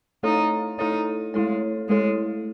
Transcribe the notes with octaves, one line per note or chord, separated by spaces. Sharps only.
A3 D#4 E4 A4 C#5
A3 D#4 E4 A4 C#5
G#3 A3 E4 A4 C#5
G#3 A3 E4 A4 C#5